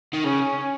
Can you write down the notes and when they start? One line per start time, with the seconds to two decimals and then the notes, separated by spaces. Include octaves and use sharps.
0.13 D#3
0.25 C#3 C#4